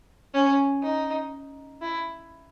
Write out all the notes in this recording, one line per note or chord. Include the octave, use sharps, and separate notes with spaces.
C#4
D#4
E4